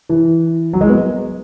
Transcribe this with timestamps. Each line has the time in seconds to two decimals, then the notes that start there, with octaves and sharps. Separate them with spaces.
0.09 E3
0.73 F#3
0.81 G#3
0.90 B3